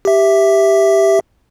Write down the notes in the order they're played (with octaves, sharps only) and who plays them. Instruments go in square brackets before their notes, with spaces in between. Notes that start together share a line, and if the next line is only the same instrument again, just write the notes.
[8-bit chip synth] G4 E5